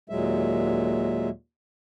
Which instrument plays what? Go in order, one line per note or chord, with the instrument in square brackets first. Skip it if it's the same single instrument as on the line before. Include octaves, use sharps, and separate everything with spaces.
[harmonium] D#2 A#2 F#3 G#3 E5